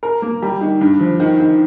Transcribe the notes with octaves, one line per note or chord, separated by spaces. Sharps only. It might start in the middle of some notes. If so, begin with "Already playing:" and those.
A#4
A#3
G3
D#3
G2
F3
D#3
D#3